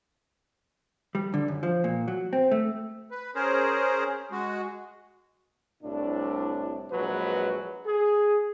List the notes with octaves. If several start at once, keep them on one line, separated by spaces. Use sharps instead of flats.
G3
D3
F#2
F3
A#2
F#3
C4
A3
B4
C#4 G#4 A#4 C5
G#3 F#4
C2 A2 D4
A#1 F#3 G#3 B4
G#4